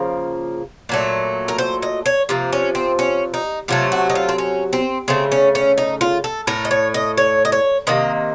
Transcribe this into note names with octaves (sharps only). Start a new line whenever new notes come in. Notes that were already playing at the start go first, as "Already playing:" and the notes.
Already playing: C#3 F3 A#3
A#2 F#3 A3
A#4
C5
D#5
C#5
C3 F3 A#3
C#4
C4
C#4
D#4
C3 F#3 A3 F4
F#4
D#4
F4
C4
C#4
C4
C#3 A3 C4
C#4
C#4
D#4
F4
A4
A2 A3 A#4
D#5
C#5
D#5
C#5
D#5
C#5
C3 D#3 A#3 D#5